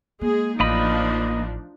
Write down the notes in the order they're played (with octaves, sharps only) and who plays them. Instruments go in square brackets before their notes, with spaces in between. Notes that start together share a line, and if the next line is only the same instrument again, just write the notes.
[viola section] G#3 G#4 [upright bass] A#3
[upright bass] A1 [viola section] F3 D4 D#4 [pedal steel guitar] A#3 D#5 B5